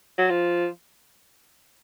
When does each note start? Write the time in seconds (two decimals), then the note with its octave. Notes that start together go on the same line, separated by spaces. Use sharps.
0.18 F#3
0.30 F3